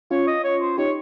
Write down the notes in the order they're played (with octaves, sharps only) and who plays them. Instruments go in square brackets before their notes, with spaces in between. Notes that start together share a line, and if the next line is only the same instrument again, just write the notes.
[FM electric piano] C#4 F4 [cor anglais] C#5
[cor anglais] D#5
C#5
C5
[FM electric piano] D#4 G4 [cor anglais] C#5